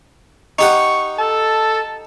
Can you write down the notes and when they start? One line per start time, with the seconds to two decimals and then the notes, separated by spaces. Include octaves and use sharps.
0.59 D#4 G4 F#5 C#6
1.19 A4 A5